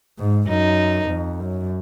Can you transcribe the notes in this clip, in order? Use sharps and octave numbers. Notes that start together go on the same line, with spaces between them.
G#2
F#2 D#4
F2
F#2